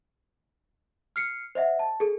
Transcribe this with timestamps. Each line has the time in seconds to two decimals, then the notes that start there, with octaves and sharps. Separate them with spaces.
1.16 F6 C7 C#7
1.55 C5 D#5 E5 F#5
1.79 A5
2.00 G#4 A4